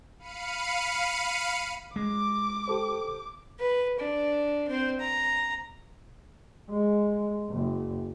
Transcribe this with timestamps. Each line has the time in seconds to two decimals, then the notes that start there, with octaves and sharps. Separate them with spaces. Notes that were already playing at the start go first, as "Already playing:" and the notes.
0.19 F5 B5 C#7 D#7
1.96 G#3 D6
2.68 G4 A4 C5
3.60 B4
3.99 D4
4.69 C4 C5
4.99 A#5
6.70 G#3
7.50 F#1